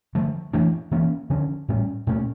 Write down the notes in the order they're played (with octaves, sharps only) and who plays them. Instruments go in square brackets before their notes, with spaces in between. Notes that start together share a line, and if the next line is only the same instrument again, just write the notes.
[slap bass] D3 F3 A3
E3 A3 D4
E3 A#3 C#4
D3 F3 C#4
A2 G3 C#4
A#2 A3 C#4